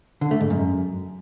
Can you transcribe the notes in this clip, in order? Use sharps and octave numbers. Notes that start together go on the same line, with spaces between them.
D3
A3
G#2
F#2